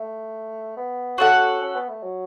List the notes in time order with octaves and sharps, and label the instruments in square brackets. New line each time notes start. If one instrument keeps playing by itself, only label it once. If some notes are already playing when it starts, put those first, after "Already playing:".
Already playing: [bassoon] A3
B3
[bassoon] C#4 [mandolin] F#4 A4 F#5
[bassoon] C#4
B3
A3
F#3